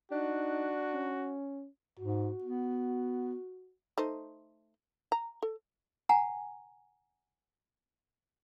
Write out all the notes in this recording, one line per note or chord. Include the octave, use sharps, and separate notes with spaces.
D4 D#4 F#4
C#4
G#2 F#4
B3
A3 D#4 C5
A#5
A4
F#5 G#5 A#5